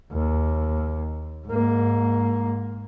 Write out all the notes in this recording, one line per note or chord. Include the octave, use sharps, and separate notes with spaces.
D#2
G#2 A#3